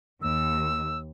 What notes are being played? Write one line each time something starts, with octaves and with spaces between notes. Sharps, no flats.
D#2 E6